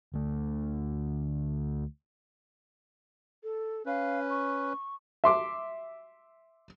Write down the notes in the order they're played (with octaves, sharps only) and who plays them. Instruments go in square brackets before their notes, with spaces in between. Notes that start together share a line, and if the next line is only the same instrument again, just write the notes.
[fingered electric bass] D2 A3
[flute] A4
[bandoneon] C#4 B4 [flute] F5
[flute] C#6
[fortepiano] E5 C6 D6